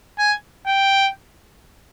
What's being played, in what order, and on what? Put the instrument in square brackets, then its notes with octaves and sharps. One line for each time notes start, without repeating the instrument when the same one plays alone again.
[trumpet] G#5
G5